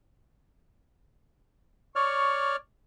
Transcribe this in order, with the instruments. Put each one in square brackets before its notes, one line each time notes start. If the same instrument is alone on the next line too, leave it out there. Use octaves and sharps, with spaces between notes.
[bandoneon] C#5 D5 F6 [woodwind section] C#6